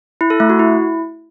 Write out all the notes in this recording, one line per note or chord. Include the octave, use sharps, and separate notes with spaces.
E4
A4
A3
F#4
E4